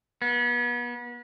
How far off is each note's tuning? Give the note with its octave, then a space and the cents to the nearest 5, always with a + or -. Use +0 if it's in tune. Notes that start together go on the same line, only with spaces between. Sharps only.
B3 -35